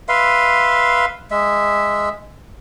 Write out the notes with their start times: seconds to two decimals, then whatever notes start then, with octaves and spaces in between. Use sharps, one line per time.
0.09 B4 E5 F5 C6
1.31 G#3 E5